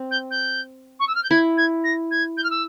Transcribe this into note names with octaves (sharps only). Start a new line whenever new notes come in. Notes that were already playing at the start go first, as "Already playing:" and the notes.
Already playing: C4
G6
G6
C#6
E6
F6
G6
E4 G#6
G#6
A#6
G#6
G6
F6
E6